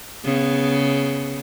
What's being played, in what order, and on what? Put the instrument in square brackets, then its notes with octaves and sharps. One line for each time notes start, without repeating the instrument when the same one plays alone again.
[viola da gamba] C#3 B3